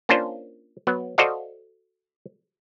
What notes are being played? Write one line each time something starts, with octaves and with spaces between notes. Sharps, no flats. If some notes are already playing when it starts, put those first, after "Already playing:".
A#3 C#4 D4 F4 C5
F#3 B3
F#4 A4 C5 D5 D#5 F5